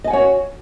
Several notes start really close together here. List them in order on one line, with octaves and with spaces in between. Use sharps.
D#5 G#5 F#5 C#5 F#4